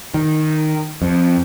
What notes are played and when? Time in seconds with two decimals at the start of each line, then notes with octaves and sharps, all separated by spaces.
0.14 D#3
1.02 F2